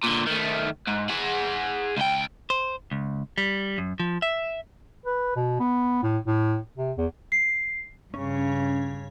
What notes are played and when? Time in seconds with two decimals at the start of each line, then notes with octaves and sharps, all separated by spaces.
0.03 A#2 D3
0.27 D#3 A3
0.88 G#2
1.10 G#4 F#5
1.97 C#2 G5
2.50 C5
2.92 C#2
3.38 G3
3.78 F#2
4.00 F3
4.22 E5
5.06 B4
5.36 B2
5.60 B3
6.03 A2
6.27 A2
6.78 C3
6.98 E2
7.32 C7
8.14 G2 C#3 C#4